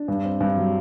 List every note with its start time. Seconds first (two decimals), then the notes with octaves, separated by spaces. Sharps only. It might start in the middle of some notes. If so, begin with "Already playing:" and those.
Already playing: D4
0.08 G2
0.25 C4
0.40 G2
0.58 F#3